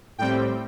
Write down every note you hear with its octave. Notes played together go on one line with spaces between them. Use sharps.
A2 G3 C4 G5